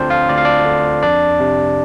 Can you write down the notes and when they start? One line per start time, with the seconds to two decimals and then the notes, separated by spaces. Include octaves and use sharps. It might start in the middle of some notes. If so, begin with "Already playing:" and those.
Already playing: D2 D3 C4 D4 F4 C5 D5 F5
0.10 F4 F5
0.29 D2 D5
0.38 F5
0.45 D4 D5
0.66 D3
1.03 F2 D4 D5
1.40 C3